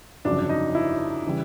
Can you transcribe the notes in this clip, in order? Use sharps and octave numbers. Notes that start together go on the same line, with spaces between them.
G1 F2 C#3 F#3 D4
D4
D#4
E4
C#3 E3 G3